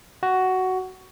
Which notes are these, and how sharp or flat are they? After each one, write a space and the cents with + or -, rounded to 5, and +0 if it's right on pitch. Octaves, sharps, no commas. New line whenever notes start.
F#4 +10